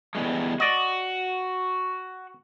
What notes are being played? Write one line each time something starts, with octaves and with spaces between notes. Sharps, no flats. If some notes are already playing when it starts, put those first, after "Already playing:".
E2 G3 G#3
F#4 D5 D#5